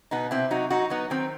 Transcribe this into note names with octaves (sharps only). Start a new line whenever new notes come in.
B2 B3 D#4
C3 C4 E4
F#3 D#4 F#4
F#3 D#4 F#4
F#3 B3 D#4
D#3 C4